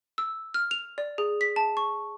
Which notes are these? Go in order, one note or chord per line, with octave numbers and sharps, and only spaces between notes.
E6
F6
F7
D5
G#4
B6
A5
C#6